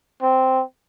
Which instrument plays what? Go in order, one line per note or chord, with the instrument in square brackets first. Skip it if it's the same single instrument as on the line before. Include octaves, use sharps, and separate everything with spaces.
[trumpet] C4